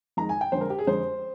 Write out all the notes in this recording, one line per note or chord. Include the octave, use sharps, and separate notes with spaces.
F2 D#3 G#3 A#5
G#5
G5
F2 D3 G#3 C5
A#4
G4
G#4
F2 D3 G#3 C5